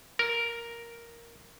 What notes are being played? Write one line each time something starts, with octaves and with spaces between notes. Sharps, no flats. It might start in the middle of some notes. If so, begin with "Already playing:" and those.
A#4